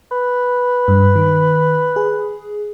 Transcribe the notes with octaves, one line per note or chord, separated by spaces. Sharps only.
B4
G2
D#3
G#4